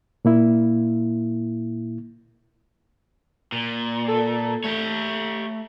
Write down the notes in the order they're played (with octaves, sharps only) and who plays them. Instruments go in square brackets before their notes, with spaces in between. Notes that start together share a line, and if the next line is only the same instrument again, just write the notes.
[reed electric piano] A#2 A#3 E4
[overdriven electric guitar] A#2
[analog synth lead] A4
[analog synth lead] A3 [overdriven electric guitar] G4 C#5